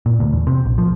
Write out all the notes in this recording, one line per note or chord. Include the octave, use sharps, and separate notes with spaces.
A#2
D2
E2
C3
A#1
F3